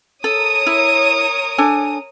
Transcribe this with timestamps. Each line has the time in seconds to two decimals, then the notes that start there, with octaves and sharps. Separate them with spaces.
0.24 A4 A#4 C#5 D#6
0.66 E4
1.58 D4 A4 G#5